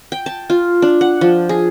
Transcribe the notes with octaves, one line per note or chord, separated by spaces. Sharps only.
G5
A5
F4
D4
F#5
F3
G#4